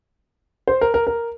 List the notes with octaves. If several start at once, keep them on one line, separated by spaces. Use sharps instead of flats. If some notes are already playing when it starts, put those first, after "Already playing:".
C5
A#4
A#4
A#4